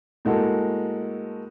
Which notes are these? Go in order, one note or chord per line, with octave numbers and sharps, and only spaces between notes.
A2 G#3 A#3 F#4 A4